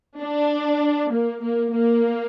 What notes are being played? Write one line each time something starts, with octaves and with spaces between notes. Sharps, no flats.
D4
A#3
A#3
A#3